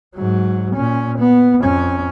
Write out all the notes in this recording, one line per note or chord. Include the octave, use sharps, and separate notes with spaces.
G#2 F#3
A#2 C#4
B3
F2 C#4